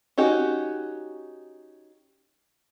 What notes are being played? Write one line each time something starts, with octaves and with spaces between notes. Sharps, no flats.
C#4 D#4 F#4 G4